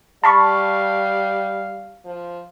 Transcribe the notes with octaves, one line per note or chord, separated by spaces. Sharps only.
G3 F5 A5 B5 C#6
F3